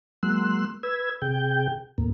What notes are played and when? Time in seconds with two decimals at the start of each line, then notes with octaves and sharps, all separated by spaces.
0.23 F#3 G#3 A#3 C6 E6 F#6
0.83 B4 E6 G#6
1.22 C3 G#4 G5 G6
1.98 D#2 A2 A#3